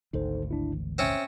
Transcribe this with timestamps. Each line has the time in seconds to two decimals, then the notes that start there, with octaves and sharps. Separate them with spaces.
0.13 G#1 D2 D#4 A4 C5
0.51 D4 E4
0.74 E3
0.98 C4 C#4 C#5 E5